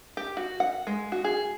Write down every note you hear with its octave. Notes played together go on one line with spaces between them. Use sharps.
G4
F#4
F#5
G#3
F#4
G#4